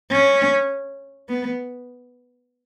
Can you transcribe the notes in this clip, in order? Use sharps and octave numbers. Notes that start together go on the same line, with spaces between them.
C#4
B3